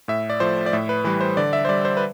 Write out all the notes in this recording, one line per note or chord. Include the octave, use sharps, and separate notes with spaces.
A2 E5
D5
F3 A3 C5
D5
A2 E5
B4
E3 G3 B4
C5
D3 D5
E5
C5
G3 D5
C5
B4